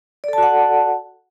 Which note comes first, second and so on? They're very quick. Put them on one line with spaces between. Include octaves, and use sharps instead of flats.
D5 A4 A5 F#4 F#5